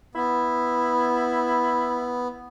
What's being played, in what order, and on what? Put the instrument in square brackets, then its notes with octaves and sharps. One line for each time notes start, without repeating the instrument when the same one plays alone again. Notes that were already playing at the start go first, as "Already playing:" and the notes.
[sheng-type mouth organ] B3 [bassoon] E4